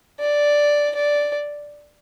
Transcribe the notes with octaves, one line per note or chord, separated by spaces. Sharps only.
D5
D5